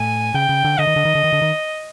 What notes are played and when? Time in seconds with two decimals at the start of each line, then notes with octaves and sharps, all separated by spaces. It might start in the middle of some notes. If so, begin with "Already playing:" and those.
Already playing: A2 G#5
0.34 C#3 G5
0.49 C#3
0.64 D3
0.79 D3 D#5
0.87 D#3
0.96 D3
1.05 D#3
1.15 D3
1.24 D#3
1.33 D3
1.42 D#3